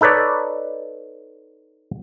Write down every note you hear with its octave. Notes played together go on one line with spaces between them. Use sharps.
D#4 A4 B4 C#5 D5